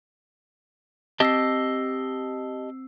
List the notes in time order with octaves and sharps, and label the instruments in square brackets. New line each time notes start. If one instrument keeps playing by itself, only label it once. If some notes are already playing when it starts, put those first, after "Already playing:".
[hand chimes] C4 E6 C7 [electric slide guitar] G4 D#5 A5